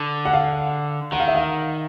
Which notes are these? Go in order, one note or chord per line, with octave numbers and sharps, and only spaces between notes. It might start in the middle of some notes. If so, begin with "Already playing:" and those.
Already playing: D3
F#5
F5
D#3 F#5
F5
E5
F5